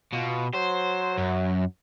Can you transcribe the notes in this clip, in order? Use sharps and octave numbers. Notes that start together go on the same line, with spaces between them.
B2 F4
F#3 C5
F#2